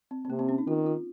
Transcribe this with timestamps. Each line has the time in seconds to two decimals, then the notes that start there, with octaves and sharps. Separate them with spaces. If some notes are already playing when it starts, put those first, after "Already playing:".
0.11 C4
0.25 C4
0.30 C3 A#3
0.39 C4
0.49 C#4
0.58 D#4
0.67 D#3 F4
0.86 F4